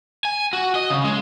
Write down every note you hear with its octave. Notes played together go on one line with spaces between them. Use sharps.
G#5
F#4
D#5
C#3
G#3